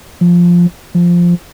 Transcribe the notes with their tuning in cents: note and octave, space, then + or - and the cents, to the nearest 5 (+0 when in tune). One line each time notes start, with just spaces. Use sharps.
F3 +0
F3 -5